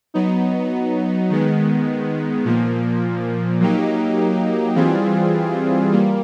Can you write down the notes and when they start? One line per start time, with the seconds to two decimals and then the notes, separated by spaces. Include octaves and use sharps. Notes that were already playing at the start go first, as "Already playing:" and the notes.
0.14 F#3 B3 D#4
1.29 D#3 G#3 B3
2.45 A#2 F3 A#3
3.60 F#3 A#3 D#4 G4
4.75 E3 G3 C4 F4 G#4
5.92 G3 A#3